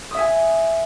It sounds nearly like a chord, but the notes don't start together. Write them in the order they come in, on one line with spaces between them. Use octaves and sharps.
D#6 E5 G#5